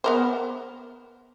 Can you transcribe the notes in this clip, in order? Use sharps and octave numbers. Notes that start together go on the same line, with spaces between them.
B3 A#4 C5